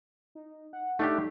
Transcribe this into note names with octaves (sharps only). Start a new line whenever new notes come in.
D#4
F#5
A3 D4 D#4 G4